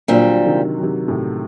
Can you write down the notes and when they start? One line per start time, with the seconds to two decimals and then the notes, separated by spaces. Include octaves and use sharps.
0.08 A#2 D3 F#3 G3 C4
0.46 C3 D#3
0.78 F#3
0.83 C3 D#3
1.08 A2 C3